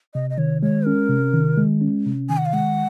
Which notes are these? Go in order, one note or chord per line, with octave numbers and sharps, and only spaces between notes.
C3 D#5
D#5
D#3 C#5
G#3 C#5
C#4 A#4
C3
D#3
G#3
C#4
C3
D#3 G#5
F#5
F5
G#3 F#5